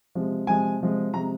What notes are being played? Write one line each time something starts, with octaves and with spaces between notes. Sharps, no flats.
C3 F3 G#3
C3 F3 G#3 G#5
C3 F3 G#3
C3 F3 G#3 A#5